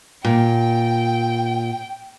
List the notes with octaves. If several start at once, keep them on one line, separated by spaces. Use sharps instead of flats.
A#2 G5